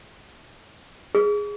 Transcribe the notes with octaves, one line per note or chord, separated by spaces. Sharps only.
G#4